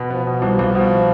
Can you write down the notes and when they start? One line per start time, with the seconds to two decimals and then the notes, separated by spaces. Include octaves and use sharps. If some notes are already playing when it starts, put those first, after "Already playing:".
Already playing: B2 B3
0.10 F3 B3
0.26 B2 F3
0.42 C2
0.59 C2
0.75 B2 F3